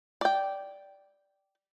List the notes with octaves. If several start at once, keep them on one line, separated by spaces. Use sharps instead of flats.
D5 G5